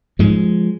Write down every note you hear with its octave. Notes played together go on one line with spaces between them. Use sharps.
G#2 F3 G#3